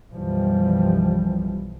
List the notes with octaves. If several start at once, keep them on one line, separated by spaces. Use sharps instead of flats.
B1 F#2 E3 F3 G3